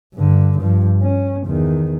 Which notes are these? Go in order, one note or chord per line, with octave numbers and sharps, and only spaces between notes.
G2 D3
G2 F3
C#4
E2 D#3